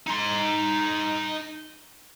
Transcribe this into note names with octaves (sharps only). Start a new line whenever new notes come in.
D#4 C6